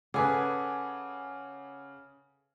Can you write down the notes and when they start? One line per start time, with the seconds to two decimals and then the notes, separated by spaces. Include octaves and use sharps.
0.14 C#3 G#4 A4 B4 F#5 G#5 D6